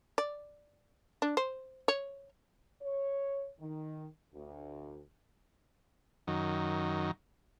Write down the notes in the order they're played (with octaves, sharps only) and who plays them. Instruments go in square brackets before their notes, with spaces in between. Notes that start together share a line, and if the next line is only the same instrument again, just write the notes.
[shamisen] D5
D4
C5
C#5
[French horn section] C#5
D#3
D2
[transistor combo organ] F#2 D#3